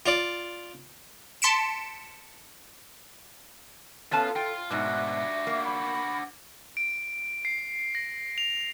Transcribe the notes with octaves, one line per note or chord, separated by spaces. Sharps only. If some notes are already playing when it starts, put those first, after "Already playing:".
F4 D5
A5 C6 B6 C#7 D7 E7
B3 C#4 F4 A4 F5 A5
F4 G5
G#2 B2 D4 F#4 E5
A#3
B5
D7
C7
A#6
F7